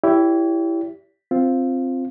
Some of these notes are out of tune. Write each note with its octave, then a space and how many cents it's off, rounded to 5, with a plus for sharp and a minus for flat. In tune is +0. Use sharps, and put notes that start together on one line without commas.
E4 +10 G4 +0 C#5 +45
C4 +0 F4 +0